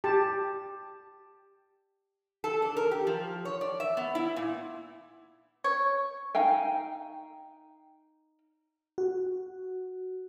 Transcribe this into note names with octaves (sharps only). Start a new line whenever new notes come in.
G4 A5
A4
D4
A#4
G4
F3
C#5
D5
E5
B3
E4
A#2
C#5
D#4 F5 G5 G#5
F#4